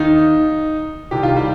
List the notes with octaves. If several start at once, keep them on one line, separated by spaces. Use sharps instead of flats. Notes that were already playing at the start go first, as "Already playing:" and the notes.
Already playing: D#2 D#3 D#4
C2 C3 D#3 G4
F4
G3 G4